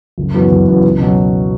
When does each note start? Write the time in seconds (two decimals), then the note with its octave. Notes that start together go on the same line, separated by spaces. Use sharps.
0.18 F#1
0.34 F#2 E3 B3 F#4
0.51 F#1
0.67 F#2 E3 B3 F#4
0.84 C#2
1.00 B2 F#3